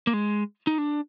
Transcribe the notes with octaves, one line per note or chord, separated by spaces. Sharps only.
A#3
G#3
D#4
D4